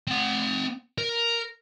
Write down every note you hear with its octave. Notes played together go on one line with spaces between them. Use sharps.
C4 F#5
A#4